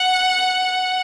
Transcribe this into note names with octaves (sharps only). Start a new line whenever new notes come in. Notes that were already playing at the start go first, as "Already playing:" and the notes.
Already playing: F#5